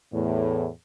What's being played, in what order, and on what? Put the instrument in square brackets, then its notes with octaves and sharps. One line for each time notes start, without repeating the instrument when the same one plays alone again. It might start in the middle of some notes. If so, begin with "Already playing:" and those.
[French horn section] E2 A2